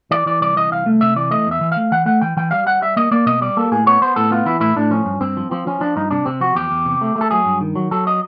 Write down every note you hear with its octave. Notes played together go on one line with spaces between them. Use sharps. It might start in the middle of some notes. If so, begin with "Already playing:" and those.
E3 D5
E3 D5
C2 D5
E3 D#5
C2 F5
A3
C3 E5
E3 D5
A3 D#5
E2 E5
E3
A3 F5
E3 F#5
A3 F#5
E3 G5
E3 G5
G3 F5
G3 F#5
G3 E5
A#3 D#5
A#3 D5
B2 D#5
G3 D5
A#3 A4
A2 G#4
B3 C#5
B3 C5
A2 A4
B3 F4
E3 E4
A2 E4
A2 D4
F3 C#4
G2
G2 C4
F3
F3 C4
F3 C#4
F3 D4
G2 D#4
C3 D4
C3 C4
F3 F#4
E2 G4
E2
C3
A3
A3
A4
F#3 G#4
G2
D#3
F#3
F#3 A4
D#5